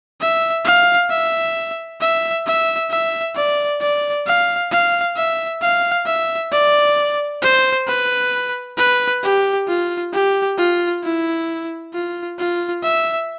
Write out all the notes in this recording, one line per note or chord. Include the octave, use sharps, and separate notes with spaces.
E5
F5
E5
E5
E5
E5
D5
D5
F5
F5
E5
F5
E5
D5
C5
B4
B4
G4
F4
G4
F4
E4
F4
F4
E5